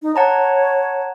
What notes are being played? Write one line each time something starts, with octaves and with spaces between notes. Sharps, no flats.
D#4
C#5 F#5 A5 A#5